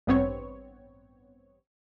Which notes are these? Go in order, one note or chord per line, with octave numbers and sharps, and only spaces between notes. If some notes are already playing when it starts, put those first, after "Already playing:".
A1 G2 B3 C4 C#5